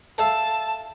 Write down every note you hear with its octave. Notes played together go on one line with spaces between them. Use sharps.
A4 E5 F5 A5